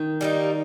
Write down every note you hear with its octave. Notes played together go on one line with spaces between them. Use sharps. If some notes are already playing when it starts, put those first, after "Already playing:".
Already playing: D#3
G3 A#3 D#4